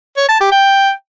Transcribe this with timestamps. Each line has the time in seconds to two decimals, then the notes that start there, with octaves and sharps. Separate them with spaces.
0.17 C#5
0.29 A5
0.41 G4
0.52 G5